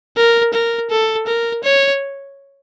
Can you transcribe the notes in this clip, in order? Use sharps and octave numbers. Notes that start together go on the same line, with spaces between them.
A#4
A#4
A4
A#4
C#5